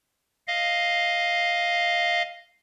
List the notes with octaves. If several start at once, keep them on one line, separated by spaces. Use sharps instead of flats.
D#5 F5